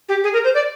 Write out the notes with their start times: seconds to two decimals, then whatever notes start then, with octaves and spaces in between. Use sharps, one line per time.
0.09 G4
0.24 G#4
0.33 A#4
0.44 C5
0.54 D5